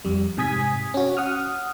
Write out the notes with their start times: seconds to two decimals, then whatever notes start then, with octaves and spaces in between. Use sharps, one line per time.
0.05 F2 G3
0.37 G#2 C3 G#5 D#6 G#6 B6
0.94 C#4 F#4
1.17 F#5 D#6 F6